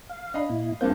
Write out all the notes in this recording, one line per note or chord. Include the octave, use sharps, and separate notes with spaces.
F5
D4 D#5 F5 B5
A#2 E4
F#1 G2 A#3 C4 F4 G6